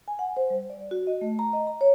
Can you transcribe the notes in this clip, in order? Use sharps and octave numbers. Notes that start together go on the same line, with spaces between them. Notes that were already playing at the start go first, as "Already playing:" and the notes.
G#5
F#5
C5
G3
D5
F#4
D#5
A3
A#5
D#5
A#5
C#5